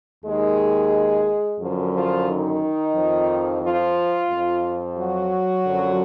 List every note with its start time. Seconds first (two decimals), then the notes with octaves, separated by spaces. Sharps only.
0.25 D#2 D#3 G#3 G#4
1.61 F#2 D3 F3
1.94 F3 F4
2.28 D#3 D#4
2.95 F2 F3
3.63 F3 F4
4.31 F2 F3
4.98 F#3 F#4
5.66 F#2 D3 F3